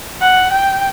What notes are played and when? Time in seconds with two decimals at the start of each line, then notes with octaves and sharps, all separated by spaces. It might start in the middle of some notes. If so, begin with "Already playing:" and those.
0.21 F#5
0.51 G5